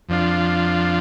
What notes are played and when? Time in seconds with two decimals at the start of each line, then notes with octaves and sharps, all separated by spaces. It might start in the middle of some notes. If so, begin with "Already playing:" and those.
0.09 F2 F3 D4 F4